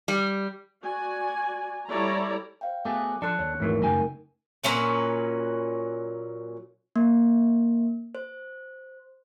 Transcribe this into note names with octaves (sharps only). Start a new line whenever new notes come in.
G3
F#4 D5 G#5
G3 E4 A4 C#5 D5 A#5
C5 F5 G5
A3 B3 F#4 G#4 D6
F3 D4 A4 C6 F#6 C#7
D#2 C#5
G#1 E3 F#3 A3 D#4 A#4
C#2 F#2 C#3 G5 G#5
A#2 F#3 C#4 B4
A#3
C5